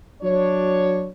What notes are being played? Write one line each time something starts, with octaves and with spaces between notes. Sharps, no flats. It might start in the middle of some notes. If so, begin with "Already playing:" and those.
F#3 D4 C#5